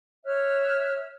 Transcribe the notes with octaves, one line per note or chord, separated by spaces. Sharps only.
C#5 E5 F6 F#6